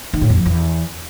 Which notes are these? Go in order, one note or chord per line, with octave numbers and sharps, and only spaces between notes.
D#3
A2
F2
F3
E2